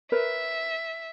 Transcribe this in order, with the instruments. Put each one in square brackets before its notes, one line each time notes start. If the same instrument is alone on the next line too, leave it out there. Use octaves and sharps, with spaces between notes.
[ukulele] A#4 B4 C#5 [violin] E5